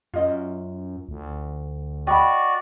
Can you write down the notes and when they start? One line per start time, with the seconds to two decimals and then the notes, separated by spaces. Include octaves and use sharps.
0.14 F#2 F4 D#5
1.09 D2
2.07 F#4 D5 D#5 G5 B5